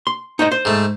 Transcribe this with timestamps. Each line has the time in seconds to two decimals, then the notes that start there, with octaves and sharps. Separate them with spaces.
0.07 C6
0.39 D#4 C5 D#5
0.52 C5
0.65 G#2 A3